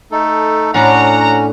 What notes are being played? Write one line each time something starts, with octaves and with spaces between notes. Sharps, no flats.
A3 D#4 A4
A2 C#4 D4 F#4 F#5 A#5